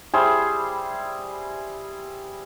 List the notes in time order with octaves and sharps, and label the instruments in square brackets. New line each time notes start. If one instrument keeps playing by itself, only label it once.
[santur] G3 E4 G#4 C5